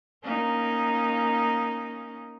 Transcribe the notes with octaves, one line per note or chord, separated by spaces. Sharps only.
A#3 C#4 D#4